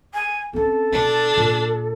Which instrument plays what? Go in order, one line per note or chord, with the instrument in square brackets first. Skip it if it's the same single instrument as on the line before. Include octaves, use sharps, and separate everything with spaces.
[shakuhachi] G#5
[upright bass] C4 C#4 [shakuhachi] A4
[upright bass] B2 E4 [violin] D4
[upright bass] A#2